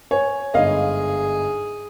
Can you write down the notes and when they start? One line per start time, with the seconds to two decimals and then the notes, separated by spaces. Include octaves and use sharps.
0.11 C#5 G#5
0.54 G1 G#2 G#4 D#5 F5